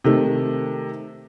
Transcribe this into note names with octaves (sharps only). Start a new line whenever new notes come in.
C3 D#3 A3